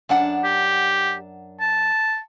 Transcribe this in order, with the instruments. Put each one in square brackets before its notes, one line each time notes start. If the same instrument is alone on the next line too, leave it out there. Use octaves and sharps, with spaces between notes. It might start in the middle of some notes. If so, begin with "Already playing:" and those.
[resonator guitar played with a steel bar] F#2 D4 F#5
[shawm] G4
A5